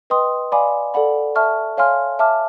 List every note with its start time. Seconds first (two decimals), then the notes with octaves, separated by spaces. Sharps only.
0.10 B4 D#5 G5 C6 D#6
0.52 D5 F5 G#5 B5 D6
0.94 A4 D5 F#5 B5
1.35 E5 A5 C#6 F6
1.77 C#5 F5 G#5 C6 F6
2.19 E5 A5 D6 F6